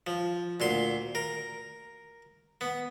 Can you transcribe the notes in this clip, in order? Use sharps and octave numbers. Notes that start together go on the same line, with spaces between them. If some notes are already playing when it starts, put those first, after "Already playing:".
F3
D2 A#2 C6
A#4
B3